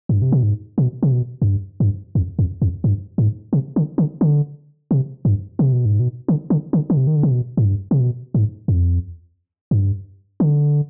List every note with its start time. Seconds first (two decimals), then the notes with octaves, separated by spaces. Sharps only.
0.09 G2
0.22 C3
0.32 B2
0.43 G#2
0.78 B2
1.03 C3
1.12 B2
1.42 F2
1.46 G2
1.80 G2
2.15 F2
2.39 F2
2.62 F2
2.84 G2
3.18 G#2
3.53 C3
3.76 D3
3.98 D3
4.21 D3
4.91 C3
5.25 G2
5.59 C3
5.72 B2
5.85 G#2
6.00 B2
6.28 D3
6.50 D3
6.73 D3
6.90 D3
6.97 C3
7.07 D#3
7.16 D3
7.23 C3
7.31 B2
7.57 G#2
7.65 G2
7.91 C3
8.00 B2
8.34 G#2
8.68 F2
9.71 G2
10.40 D3